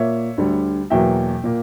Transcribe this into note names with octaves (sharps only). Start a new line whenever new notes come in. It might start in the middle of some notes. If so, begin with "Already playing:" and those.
Already playing: A#2 A#3 C#5 E5
D2 D3 G3
E2 B2 F#3 A#3 E5 G5
A#2 A#3